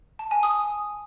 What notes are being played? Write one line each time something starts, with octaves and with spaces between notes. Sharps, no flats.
A5
G#5
D#6